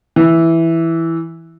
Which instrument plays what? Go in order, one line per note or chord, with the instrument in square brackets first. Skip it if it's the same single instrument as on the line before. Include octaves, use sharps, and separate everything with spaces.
[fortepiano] E3